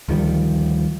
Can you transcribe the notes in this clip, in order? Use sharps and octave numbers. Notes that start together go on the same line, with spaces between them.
D2 D#3 F3 G3